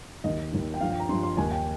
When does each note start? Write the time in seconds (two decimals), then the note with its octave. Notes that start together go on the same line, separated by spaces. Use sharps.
0.24 D#2 D#3 D#5
0.53 D#2 D#3
0.74 G5
0.81 G2 F3 F5
0.90 G5
1.00 A#5
1.09 G2 F3 C6
1.23 C6
1.37 D#2 D#3 G#5
1.51 G5